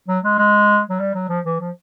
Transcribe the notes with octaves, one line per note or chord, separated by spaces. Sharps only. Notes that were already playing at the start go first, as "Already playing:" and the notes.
F#3
G#3
G#3
F#3
G3
F#3
F3
E3
F3